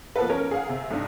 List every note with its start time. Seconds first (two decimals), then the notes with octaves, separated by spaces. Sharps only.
0.16 F3 A#3 B3 A4 B4
0.30 C#4 A#4
0.51 G#4 F5 F#5
0.69 C3
0.91 B1 G2